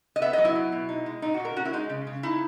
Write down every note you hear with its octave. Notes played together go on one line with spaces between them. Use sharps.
D#5
B3 E5
F#3 D#5
E4
B2
B2
D#4
G#3
A#2 D#4
F#4
A#2
A#4
C#4 F#4
E4
G#3 D#4
C#3
C#3
D#4 E4